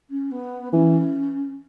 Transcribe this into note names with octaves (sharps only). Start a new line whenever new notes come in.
C#4
B3
E3 C#4